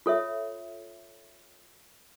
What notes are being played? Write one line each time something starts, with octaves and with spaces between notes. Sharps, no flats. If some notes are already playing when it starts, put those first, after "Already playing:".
F4 A4 C#5 E5